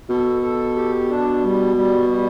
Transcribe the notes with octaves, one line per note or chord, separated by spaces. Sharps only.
B2 A4
A4
G4
D4
G3
G3
G3